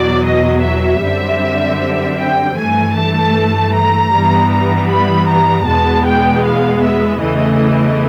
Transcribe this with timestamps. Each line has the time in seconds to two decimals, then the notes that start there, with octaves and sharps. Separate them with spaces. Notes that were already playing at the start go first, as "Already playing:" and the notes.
Already playing: E2 B2 F#3 D5
0.25 D#5
0.64 E5
1.03 F#2 D3 G3 C4
2.19 G5
2.57 G2 E3 A3 G#5
2.96 A5
3.73 A#5
4.12 G2 E3 G3 B3
4.51 A#5
4.90 B5
5.28 A#5
5.66 E2 B2 G#3 B3 A5
6.05 G5
6.44 F5
6.82 E5
7.21 E2 C#3 E3 A3 D#5